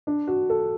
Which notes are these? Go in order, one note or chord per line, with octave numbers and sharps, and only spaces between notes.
D4
F#4
A4